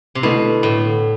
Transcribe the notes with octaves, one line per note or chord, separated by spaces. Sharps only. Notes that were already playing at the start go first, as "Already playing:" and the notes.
C3
B2 D3 A3 E4
A2